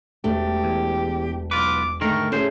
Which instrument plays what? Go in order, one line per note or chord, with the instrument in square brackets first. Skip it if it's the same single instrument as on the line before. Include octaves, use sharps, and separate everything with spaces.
[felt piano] E1 [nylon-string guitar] A3 [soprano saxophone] G4
[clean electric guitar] E2
[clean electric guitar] B1 F4 B4 [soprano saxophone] D6
[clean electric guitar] G#2 D#3 A#4 [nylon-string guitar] D3 A3 [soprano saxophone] C#6
[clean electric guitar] A2 C5 [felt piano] A3 G#4 [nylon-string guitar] C#4